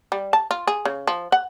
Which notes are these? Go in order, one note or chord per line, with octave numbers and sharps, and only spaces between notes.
G3
A5
F4
G#4
C#3
F3
F#5